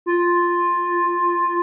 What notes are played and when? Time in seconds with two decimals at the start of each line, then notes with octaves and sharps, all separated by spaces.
0.06 F4